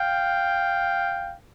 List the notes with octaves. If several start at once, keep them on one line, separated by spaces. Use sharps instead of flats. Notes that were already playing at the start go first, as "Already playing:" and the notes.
Already playing: F5 G5